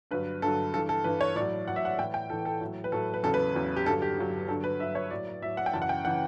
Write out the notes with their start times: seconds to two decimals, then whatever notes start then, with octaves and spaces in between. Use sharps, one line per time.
0.11 G2 D3 F#3 B4
0.42 G2 D3 F#3 A4
0.74 G2 A4
0.78 E3
0.89 A4
1.04 G2 E3 B4
1.21 C#5
1.36 A2 F#3 D5
1.68 A2 F#3 F#5
1.76 E5
1.85 F#5
1.98 A2 E3 G5
2.14 G5
2.30 A2 E3 A4
2.45 A4
2.61 A2 F#3
2.84 B4
2.92 A2 F#3 A4
3.14 B4
3.23 E2 C#3 F#3 A4
3.34 B4
3.55 E2 C#3 F#3
3.76 G4
3.86 G2 D3 F#3 A4
4.02 G4
4.17 G2 D3 F#3
4.48 G2 D3 F#3 A4
4.64 B4
4.80 G2 D3 F#3 E5
4.95 C#5
5.10 A2 F#3 D5
5.42 A2 F#3 E5
5.57 F#5
5.66 G5
5.73 F#2 C#3 E3 A5
5.82 F#5
5.89 G5
6.05 C#3 E3 F#5